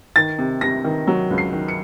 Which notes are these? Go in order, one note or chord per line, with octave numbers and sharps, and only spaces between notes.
D#3 A6
C3
C3 A#6
D#3
F#3
C#2
C7
D#3
C#7